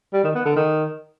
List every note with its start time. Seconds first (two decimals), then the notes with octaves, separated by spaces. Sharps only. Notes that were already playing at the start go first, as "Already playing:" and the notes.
0.13 G3
0.24 D#3
0.35 B3
0.46 D3
0.56 D#3